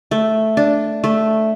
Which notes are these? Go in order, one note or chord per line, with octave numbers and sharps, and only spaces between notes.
A3
D4
A3